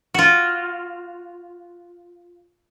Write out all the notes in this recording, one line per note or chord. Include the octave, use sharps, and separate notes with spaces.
F4 F#4